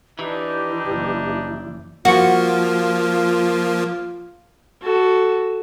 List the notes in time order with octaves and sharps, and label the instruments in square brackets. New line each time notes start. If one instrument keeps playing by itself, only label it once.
[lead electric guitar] E3 [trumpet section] D4 D#4 [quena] G4
[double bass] F#1
[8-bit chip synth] F3 A#3 [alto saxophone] F4 [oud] F#4
[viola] F#4 A4